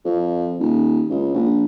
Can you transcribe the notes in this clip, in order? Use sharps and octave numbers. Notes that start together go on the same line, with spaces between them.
F2
D#1
C#2
A#1